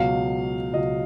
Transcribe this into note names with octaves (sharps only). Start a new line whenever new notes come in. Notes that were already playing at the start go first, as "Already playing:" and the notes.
Already playing: C#2 B2 F#3 F5
C#2 B2 F#3 D#5